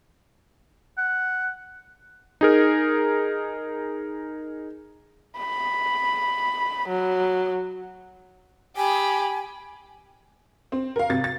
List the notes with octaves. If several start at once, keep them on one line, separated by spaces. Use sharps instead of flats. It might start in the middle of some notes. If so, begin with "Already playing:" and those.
F#5
D#4 G#4 A#4
B5
F#3
G4 G#5 B5
C4
A#4 F5
G#1 C3 A6
A6